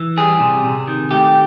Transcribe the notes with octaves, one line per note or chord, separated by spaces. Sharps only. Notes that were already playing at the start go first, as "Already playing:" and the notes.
Already playing: E3
G3 G#4
C3
C3
D#3
A3 G4